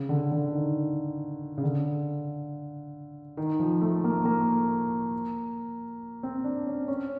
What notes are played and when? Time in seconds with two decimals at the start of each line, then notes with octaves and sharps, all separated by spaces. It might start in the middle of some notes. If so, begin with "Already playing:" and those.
Already playing: C#3
0.09 D3
0.32 D3
0.52 D#3
1.58 C#3
1.63 D3
3.37 D#3
3.60 F3
3.81 A3
4.04 A#3
4.25 A#3
6.23 C4
6.44 D4
6.67 C#4
6.88 C#4